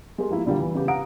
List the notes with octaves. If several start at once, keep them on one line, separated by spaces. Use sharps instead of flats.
G#3 G4 A#4 C6
F3 A#3 E4
A#2 D3 G3 A#3
E3
C#3 B3 G4
F5 F#5 A#5 D#6 D7